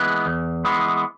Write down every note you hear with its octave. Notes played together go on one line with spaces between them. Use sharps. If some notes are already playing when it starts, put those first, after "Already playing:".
Already playing: E3 G#3 B3
E2
E3 G#3 B3